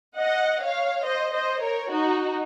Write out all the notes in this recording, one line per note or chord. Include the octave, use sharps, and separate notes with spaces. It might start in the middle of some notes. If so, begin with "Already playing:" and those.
D#5 F#5
C#5 F5
C5 D#5
C5 D#5
A#4 C#5
D#4 F#4